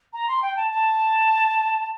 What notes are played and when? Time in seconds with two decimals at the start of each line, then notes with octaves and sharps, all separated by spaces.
0.13 A#5
0.28 C6
0.42 G5
0.56 A5
0.71 A5